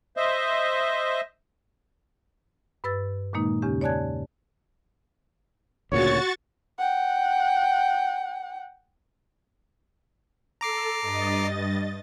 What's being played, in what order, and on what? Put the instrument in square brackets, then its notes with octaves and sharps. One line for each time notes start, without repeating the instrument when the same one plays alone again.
[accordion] C5 D#5 E5
[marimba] G2 B4 E6 A6
A#2 D#3 G#3 A#3 D#4
E2 C#3 C#4 G4
C#5 D5 G#5 A5 F#6 G#6
[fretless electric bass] D2 A#2 C#3 [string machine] F#4 C#6 A6 [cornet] C#5
[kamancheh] F#5 G5
[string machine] A4 [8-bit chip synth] A#5 D6 C7
[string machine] G2 D#5 A6